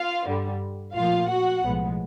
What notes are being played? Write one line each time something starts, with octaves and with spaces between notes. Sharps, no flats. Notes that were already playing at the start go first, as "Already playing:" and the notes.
Already playing: F4 F5
G2 D3 G3
A#1 A2 F3 A#3 F4 F5
F#4 F#5
B1 A2 F3 G#3 B3